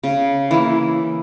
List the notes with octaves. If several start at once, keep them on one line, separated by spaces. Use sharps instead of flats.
C#3
E3 A#3 E4